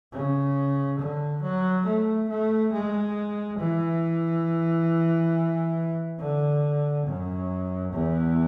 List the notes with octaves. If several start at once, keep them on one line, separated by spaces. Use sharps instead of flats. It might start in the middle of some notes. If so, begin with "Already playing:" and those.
C#3
D3
F#3
A3
A3
G#3
E3
D3
F#2
E2